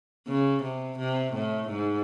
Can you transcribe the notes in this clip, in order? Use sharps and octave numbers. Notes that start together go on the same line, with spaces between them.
C#3
C3
C3
A2
G#2